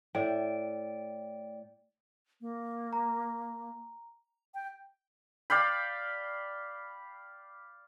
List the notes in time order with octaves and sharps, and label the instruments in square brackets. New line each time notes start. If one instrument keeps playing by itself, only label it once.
[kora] A2 [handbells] D5 G5
[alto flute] A#3
[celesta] A#5
[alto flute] G5
[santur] D5 F5 G5 B5